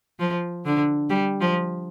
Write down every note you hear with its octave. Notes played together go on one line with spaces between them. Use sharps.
F3
D3
G3
F3